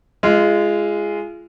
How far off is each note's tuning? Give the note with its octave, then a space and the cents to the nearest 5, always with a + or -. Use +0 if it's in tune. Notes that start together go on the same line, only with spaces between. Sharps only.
G#3 -5 F4 -30